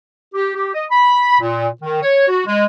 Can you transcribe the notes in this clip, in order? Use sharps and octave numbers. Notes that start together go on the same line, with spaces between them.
G4
G4
D#5
B5
A#2
D#3
C#5
F#4
G#3